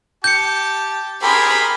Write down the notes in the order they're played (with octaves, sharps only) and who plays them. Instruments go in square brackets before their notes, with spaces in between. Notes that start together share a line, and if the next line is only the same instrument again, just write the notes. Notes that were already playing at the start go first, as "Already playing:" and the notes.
[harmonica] G4 A5 [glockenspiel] G6 C#7
[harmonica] G4 G#4 A#4 [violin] B5 C6